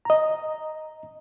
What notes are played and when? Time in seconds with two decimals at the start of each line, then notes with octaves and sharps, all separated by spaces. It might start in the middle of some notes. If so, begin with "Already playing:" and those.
0.05 D#5 A#5